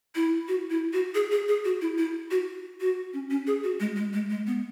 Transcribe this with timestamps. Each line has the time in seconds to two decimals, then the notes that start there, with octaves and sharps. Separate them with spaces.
0.15 E4
0.48 F#4
0.70 E4
0.93 F#4
1.15 G#4
1.31 G#4
1.48 G#4
1.65 F#4
1.81 E4
1.98 E4
2.31 F#4
2.81 F#4
3.13 C#4
3.30 C#4
3.47 G#4
3.64 F#4
3.80 G#3
3.96 G#3
4.13 G#3
4.30 G#3
4.47 B3